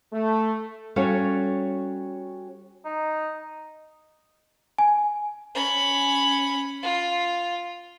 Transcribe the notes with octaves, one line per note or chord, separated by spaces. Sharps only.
A3
G3 C#4 F#4 A4 C#5 F5
D#4
G#5
C#4 B5
F4